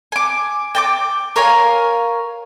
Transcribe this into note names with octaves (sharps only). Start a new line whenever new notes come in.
G#5 D6
G5 A5 D6
A#4 C#5 F5 G#5